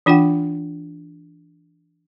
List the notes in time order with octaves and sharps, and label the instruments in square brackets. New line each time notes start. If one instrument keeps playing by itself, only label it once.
[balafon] E3 D4 F4 F#5 G5